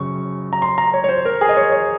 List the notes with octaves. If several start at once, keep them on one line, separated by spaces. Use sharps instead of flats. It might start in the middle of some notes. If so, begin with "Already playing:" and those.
Already playing: F#2 C#3 C#6
A#5
C6
A#5
C#5
C#5
C5
A#4
G#4
D#5
C#5
C#5